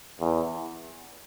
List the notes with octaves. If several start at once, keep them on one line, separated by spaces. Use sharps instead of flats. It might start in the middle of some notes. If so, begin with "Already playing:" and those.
E2